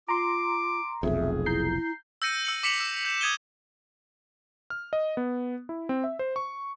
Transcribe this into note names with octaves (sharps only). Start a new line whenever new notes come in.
F4 A#5 C6 D6
F1 B1 F2 G#4 E5
E4 A#5 G6 C7
E6 G6 A#6 C#7 D#7
E6 C#7 F#7
D6 B6 C#7 F7 F#7
E6
G6 E7
D#6 G#6 D#7 G7
F6
D#5
B3
E4
C4
E5
C5
C#6